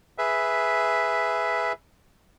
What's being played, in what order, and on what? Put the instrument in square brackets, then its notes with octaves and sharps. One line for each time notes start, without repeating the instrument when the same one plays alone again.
[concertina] G#4 B4 E5